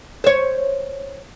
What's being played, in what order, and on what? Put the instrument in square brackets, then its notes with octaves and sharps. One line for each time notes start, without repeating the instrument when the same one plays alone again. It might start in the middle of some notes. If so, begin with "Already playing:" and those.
[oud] C5 C#5